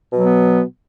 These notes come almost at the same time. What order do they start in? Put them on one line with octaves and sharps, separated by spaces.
B2 F#3 B3